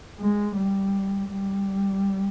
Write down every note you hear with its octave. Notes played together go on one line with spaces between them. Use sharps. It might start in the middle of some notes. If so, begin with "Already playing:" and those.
G#3
G3
G3